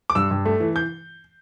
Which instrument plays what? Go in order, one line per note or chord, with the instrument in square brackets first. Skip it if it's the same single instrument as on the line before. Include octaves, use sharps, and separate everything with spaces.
[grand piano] D6
G2 E6
G2
A3
E3
G6